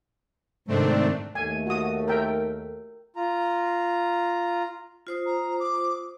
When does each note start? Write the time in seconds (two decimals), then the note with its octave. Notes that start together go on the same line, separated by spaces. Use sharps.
0.68 G#2 C3 D#3 A3 C4 D4
1.35 D#2 A3 G#5
1.67 F#4 D#6
2.08 A#4 E5 G5
3.16 F4 A#5
5.07 F4 C5 D#6
5.26 A#5
5.60 D6